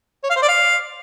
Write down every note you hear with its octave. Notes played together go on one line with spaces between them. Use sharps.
C#5
F5
C5
D5
F5